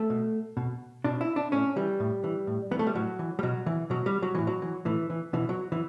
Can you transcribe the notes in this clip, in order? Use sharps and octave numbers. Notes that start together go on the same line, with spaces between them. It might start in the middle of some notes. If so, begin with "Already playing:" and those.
Already playing: A3
B2
B2
B2 D4
E4
D4
A2 C#4
E3 G3
A2
E3
A2
E3 B3
A3
G3
A2 F#3
E3
G3
B2 F#3
E3
B2 F#3
G3
F#3
A2 E3
F#3
E3
A2 E3
E3
B2 E3
F#3
E3